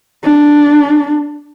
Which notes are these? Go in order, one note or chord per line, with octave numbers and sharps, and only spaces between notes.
D4